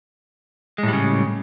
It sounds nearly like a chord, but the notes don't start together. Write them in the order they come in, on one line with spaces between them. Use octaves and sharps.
G#3 A2 G3 C#3